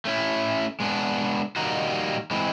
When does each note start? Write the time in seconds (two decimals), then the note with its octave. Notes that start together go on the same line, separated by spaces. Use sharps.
0.05 A3 C#4 E4
0.80 G#3 B3 D4
1.56 D#3 G3 A#3 D#4 F#4
2.31 E3 G#3 C4